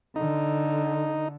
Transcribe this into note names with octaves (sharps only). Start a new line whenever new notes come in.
D3 D#4